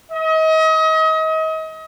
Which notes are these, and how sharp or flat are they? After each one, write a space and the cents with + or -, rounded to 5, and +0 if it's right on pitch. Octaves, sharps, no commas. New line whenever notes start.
D#5 +35